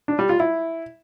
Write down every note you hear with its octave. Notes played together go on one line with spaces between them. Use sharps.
D4
G3
F4
E4